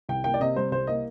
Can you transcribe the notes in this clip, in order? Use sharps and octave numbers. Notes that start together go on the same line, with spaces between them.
C2 G5
A#3 G5
D5
C3 D#5
G3 C5
C2 C5
A#3 D#5